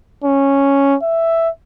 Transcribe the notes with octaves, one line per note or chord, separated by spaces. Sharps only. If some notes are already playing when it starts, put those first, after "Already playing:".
C#4
E5